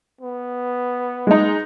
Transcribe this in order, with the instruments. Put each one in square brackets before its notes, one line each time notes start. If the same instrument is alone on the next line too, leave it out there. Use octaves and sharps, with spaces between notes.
[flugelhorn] B3
[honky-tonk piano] G#3 D#4